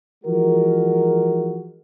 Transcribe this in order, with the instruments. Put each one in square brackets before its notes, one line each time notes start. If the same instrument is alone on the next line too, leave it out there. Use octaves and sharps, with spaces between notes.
[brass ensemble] E3 F3 G#3 F#4 A#4